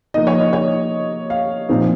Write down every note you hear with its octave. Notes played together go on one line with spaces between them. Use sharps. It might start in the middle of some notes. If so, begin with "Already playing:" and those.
F3 A#3 D#4 D#5
C#5
D#5
C#5
F5
A#2 F3 C4 D#4